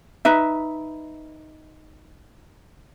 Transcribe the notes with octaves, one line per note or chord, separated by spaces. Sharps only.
D#4 B4 E5